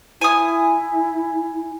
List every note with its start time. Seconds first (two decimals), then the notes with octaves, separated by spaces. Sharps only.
0.21 E4 G#5 D#6